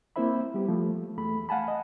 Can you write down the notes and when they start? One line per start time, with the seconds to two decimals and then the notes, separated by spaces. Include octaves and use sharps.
0.16 A#3 C4 E4 C5 E5 B5
0.54 G3 B3 G4
0.68 F3 A3
1.17 E2 A3 B5
1.49 F5 F#5 G#5 A5 B5
1.68 D#5